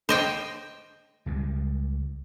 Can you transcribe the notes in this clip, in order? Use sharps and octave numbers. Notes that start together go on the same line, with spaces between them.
C5 D#5 G5
C#2 G3 G#3